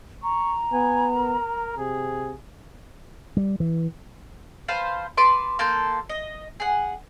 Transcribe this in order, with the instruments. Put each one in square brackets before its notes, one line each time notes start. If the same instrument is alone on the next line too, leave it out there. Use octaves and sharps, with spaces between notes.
[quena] A#5 [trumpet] C#6
[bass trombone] B3 [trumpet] G#5
[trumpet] A#4
[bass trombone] C3 [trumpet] G#4
[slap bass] G3
E3
[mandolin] B4 C5 F5 A5
B4 A5 C6 D6
A#3 A4 C6 G6
D#5
G#4 F#5